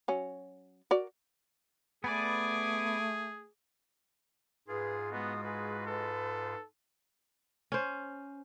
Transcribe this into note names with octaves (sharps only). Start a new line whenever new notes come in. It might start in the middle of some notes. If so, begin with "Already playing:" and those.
F#3 C#4
F#4 A#4 D5
A3 B3 G#4 B4 D5 G#5 D6
G#2 F4 G#4 B4
G#3 B3 F#4 D#6
G#4 B4
A4 B4
C#4 C5